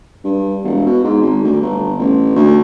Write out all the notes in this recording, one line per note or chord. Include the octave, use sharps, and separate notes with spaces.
G2
E1
B2
G#2
G#1
D2
G1
A1
D2